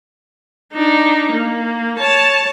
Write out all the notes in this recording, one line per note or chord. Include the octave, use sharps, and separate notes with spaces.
D4 D#4
A#3
C#5 A5